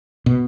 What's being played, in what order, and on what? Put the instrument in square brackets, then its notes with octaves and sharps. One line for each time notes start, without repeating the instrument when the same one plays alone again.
[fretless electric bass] B2